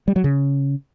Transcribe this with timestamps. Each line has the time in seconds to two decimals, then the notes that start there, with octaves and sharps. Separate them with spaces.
0.08 G3
0.16 F#3
0.24 C#3